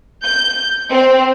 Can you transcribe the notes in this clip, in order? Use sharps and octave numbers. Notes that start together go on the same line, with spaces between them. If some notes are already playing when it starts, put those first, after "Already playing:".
G6
C4